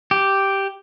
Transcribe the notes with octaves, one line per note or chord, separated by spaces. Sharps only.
G4